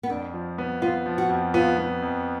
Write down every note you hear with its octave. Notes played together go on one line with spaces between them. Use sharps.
B3
F2 D4
F3
B3
B3 F4
F3
F#4
F2
B3 F4
B3
F2